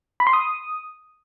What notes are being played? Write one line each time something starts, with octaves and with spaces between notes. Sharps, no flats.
B5
C6
D#6